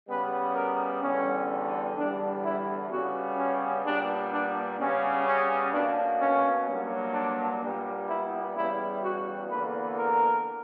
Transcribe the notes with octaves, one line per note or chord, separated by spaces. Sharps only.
C#3 G3 B3 B4
A#4
E2 D3 G3 C#4
E2 D3 G3 D4
E4
C#3 G3 B3 F#4
C#4
A#2 G3 B3 D4
D4
C#3 G3 B3 C#4
C#4
B2 A#3 D4
C#4
G2 F#3 A#3
D4
A#2 G3 B3
E4
E2 C#3 G3 E4
F#4
E2 D3 A#3 B4
A#4